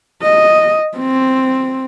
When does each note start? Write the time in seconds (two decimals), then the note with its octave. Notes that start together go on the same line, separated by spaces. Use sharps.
0.22 D#5
0.97 C4